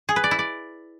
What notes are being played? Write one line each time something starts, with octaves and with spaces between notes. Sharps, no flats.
G#4
B4
D5
E4
D5